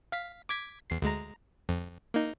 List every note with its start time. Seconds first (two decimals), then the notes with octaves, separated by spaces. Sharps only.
0.12 F5 B6
0.49 D6 G#6 B6
0.90 E2 C7
1.02 D2 G#3 A#5
1.69 F2
2.14 A#3 D#4